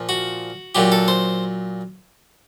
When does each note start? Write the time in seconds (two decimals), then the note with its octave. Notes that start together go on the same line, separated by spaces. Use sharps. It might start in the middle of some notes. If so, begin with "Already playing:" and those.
Already playing: A#2 F3
0.09 F#4
0.75 A#2 F#3 G4
0.92 A4
1.08 C5